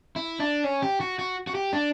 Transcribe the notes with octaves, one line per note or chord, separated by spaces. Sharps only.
E4
D4
C#4
G4
F#4
F#4
F#4
G4
D4